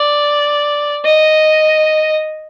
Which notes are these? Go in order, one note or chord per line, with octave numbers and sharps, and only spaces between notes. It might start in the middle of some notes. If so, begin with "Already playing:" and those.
Already playing: D5
D#5